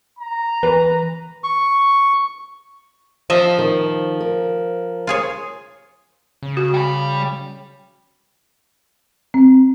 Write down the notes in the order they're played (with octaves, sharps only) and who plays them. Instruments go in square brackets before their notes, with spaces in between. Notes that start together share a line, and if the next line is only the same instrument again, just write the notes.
[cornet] A#5
[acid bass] E3 [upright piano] B4
[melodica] C#6
[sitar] F3 [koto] D#5 E5
[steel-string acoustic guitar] D#3
A#4
[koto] F4 G#4 C#5
[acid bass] C#3
[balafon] F#4
[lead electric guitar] G3 B5
[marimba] C4